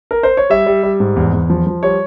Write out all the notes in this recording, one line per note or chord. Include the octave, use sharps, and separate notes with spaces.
A#4
C5
C#5
G3 E5
G3
G3
G#2
E2
E2
F3
F3
G3 C#5